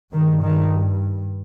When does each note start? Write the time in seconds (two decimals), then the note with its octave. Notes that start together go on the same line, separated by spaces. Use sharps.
0.13 G2 D#3
0.42 D#3